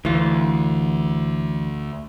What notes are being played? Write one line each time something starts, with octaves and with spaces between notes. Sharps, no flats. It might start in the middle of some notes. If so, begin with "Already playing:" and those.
D2 E3 F4